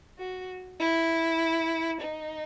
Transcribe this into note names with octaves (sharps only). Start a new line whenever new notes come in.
F#4
E4
D#4